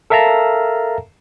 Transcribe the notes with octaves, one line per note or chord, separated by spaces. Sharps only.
A4 A#4 E5 F5 A5 A#5